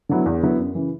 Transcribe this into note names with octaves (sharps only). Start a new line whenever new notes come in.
D3 F#3 B3 E4
E2
D3 F#3 B3 E4
F#2
C#3 E3